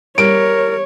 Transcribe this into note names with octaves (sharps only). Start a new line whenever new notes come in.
G3 A#4 C#5 D7